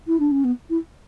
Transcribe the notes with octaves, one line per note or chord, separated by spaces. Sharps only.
E4
D4
C#4
B3
E4